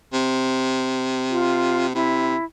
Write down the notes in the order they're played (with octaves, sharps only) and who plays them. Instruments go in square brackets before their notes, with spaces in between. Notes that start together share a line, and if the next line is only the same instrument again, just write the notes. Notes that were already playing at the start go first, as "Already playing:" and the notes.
[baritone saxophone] C3
[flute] F4
[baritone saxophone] C3 [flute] E4